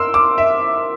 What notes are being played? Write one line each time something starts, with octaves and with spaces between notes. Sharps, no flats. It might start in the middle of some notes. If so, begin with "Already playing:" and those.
Already playing: A#4 C6 E6
D6
E5